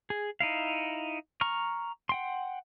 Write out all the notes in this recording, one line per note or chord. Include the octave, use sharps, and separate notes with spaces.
G#4
D#4 E4 F5
A#5 C#6 F6
F#5 G5 C6